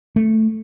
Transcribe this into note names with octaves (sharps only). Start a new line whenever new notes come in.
A3